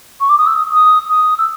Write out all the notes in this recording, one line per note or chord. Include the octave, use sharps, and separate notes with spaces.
C#6
D6
D#6
E6
D#6
D#6
D#6
E6